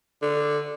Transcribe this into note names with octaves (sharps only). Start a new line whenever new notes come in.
D3